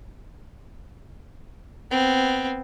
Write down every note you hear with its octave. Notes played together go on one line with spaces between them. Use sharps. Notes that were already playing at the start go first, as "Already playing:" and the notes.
B3 C4